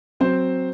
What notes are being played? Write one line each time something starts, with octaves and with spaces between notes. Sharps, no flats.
F#3 C4 C5